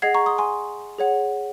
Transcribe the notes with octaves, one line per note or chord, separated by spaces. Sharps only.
G#4 D#5 F#5 G#6 C7
A#5 C#6
C6 D#6
G#5 C6
G#4 C#5 F#5